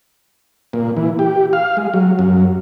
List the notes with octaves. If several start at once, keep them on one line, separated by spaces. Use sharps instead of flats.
A#2
E3
G4
F5
G#3
F#3
F#2